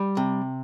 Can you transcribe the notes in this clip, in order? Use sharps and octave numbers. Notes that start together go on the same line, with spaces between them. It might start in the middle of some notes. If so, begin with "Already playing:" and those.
Already playing: G3
C3